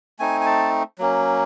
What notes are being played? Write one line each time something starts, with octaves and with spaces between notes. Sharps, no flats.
A3 C4 D#4 G#5
G#5
A5
F#3 A#3 C#4